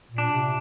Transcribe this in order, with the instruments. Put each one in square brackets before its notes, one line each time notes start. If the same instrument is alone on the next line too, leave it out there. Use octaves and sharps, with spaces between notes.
[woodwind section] A#2
[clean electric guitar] D4
[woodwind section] C3